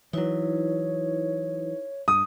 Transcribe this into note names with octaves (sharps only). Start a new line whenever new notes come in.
E3 F#3 D#4 E4 B4 C#5
G2 D#6